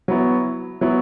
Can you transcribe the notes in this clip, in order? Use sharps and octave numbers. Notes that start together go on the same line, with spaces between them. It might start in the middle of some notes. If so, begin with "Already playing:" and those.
F#3 B3 E4
F#3 B3 E4